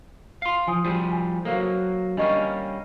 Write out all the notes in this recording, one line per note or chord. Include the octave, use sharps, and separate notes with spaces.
F5 C6
F3 G#5 D#6
F3 G3 G#4
G#5
F#3 A#3 A4 C5 F5
G3 A#3 C#4 D4 D#5 C#6